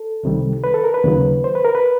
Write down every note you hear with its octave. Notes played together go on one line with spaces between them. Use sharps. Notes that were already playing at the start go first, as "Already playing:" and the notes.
Already playing: A4
C2 C3 D#3 G3
B4
A4
A#4
B4
D#2 C#3 F#3
C5
B4
A#4
B4